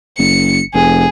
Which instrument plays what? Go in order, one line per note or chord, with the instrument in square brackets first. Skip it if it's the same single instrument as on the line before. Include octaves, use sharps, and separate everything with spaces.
[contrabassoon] F#1 [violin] C#7
[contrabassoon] F1 [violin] G#4